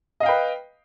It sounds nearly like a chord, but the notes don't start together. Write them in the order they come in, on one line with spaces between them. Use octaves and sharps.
D#5 F5 G5 B4